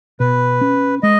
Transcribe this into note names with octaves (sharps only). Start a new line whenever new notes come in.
B2 B4
C#4
G#3 D#5